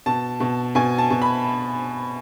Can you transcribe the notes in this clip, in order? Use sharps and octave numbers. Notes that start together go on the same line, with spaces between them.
B2 A5
B2
B2 G#5
A5
B2
B5